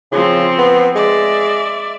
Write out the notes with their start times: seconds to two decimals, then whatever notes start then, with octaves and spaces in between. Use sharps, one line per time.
0.12 C#3 F3 C4
0.59 B3
0.96 G#3 D5 E5